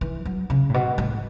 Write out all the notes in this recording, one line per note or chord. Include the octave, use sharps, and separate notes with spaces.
E3
F#3
C#3
A2
B2
A2